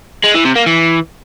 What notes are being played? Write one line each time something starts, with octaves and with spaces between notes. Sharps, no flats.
G#3
E3
C3
A#3
E3